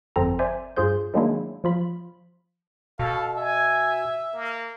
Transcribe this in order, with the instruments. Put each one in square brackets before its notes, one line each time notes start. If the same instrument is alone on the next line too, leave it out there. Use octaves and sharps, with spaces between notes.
[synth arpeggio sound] G1 F2 C4 A4 A#5
C5 D5 E5 G#5
G2 F4 G#4 C5 G6
D#3 F#3 G#3 A#3 D4 E4
F3 F4 B5
[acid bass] B2 [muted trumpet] A4 [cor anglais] F5
[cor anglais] E5 [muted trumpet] G#5
[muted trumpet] A#3